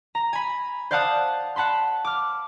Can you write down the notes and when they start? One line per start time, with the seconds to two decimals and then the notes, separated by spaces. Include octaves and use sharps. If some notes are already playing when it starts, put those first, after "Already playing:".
0.15 A#5
0.33 G#5 B5
0.91 C5 D5 F5 F#5 A5 D#6
1.56 F#5 A5 B5 C6
2.05 D6 F6